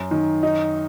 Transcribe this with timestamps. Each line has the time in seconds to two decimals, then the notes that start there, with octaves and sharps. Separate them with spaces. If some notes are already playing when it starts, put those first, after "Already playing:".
Already playing: F#2
0.11 D#3
0.43 D#4